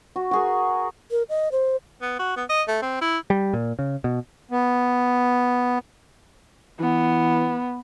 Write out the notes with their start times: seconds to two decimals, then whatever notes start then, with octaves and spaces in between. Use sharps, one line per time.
0.16 F#4
0.31 F#4 G#4 A#4
1.11 A#4
1.29 D#5
1.52 C5
2.02 B3
2.19 F#4
2.36 B3
2.49 D#5
2.68 A3
2.82 C4
3.01 E4
3.30 G3
3.54 A#2
3.79 C#3
4.04 B2
4.51 B3
6.80 E3 B3